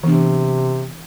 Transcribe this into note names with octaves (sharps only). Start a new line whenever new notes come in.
C3 E3 B3 D4